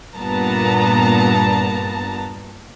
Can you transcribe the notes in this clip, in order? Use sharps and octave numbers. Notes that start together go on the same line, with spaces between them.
G2 A#2 B3 A5 A#5